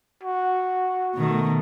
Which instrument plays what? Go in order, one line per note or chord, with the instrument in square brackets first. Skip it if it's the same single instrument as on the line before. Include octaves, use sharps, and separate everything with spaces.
[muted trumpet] F#4
[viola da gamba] B2 D#3 A3